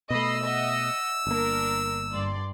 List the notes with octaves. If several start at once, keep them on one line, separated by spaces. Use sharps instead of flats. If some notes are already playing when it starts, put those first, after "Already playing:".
B2 A3 D#5 B5 E6 C7
D#5 E5 F#5
G1 A#3 D4 A#4
G2 D5 C6